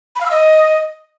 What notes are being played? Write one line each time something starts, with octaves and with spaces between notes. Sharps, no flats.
B5
F5
E6
D#5